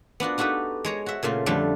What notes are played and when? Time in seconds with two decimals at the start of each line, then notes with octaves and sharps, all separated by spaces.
0.20 B3 D4 F4 F#4
0.38 D#4 F#4 G4 A4 B4
0.85 G#3 C#5 A#5
1.06 F#4 E5
1.23 A#2 C#3 A3 F4
1.46 F2 D3 G3 A3 F4 A4